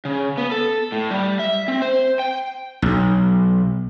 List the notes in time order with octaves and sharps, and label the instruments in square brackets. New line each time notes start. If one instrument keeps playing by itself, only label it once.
[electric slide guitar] C#3
B3
A4
A2
G3
E5
C4
C5
G5
[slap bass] B1